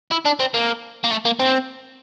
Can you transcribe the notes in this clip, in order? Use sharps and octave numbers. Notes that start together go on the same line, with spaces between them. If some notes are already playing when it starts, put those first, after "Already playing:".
E4
D4
C4
A#3
A#3
A3
A#3
C4